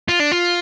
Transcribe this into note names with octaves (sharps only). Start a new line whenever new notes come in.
F4
D4
F4